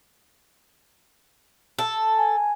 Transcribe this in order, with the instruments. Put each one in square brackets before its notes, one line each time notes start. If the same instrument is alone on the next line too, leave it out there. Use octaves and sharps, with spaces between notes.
[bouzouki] A4
[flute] G#5